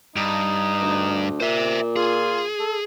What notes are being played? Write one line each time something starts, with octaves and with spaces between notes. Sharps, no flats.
G2 D#4
D2
A#2 C5 E5
F4 G#4
A4